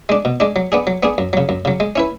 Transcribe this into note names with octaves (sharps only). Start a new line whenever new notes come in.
G#3 D4
B2
G#3 D4
F#3
B3 D4 G#4
F#3
B3 D4 G#4
F#2
C#3 F#3
F#2
C#3 F#3
G#3
C#4 E4 B4